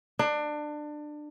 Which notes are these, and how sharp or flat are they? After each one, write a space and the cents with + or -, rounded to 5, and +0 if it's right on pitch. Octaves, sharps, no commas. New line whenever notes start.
D4 +25